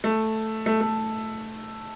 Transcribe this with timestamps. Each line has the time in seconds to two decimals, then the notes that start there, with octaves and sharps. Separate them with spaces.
0.04 A3
0.66 A3
0.81 A3